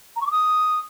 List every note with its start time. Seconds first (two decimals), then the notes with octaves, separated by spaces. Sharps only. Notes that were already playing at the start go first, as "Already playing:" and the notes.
0.16 A#5
0.21 C#6
0.26 D6
0.32 D#6